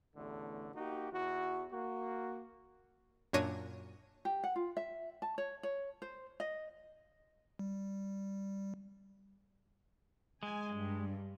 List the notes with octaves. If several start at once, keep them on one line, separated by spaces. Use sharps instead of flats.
A1 E2 D3 A3
A#3 D#4 F#4 G4
E2 E3 F#4
A#3 F#4
F#2 A#2 D4 C#5 A#6 D#7
G4
F#5
F4
E5
A5
C#5
C#5
C5
D#5
G3
G#3 G#5
G2